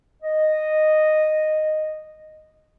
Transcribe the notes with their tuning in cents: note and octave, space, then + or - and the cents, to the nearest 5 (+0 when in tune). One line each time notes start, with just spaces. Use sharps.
D#5 -10